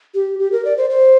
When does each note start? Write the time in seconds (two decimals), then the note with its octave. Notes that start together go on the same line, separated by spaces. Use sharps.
0.15 G4
0.39 G4
0.52 A#4
0.65 D5
0.77 C5
0.90 C5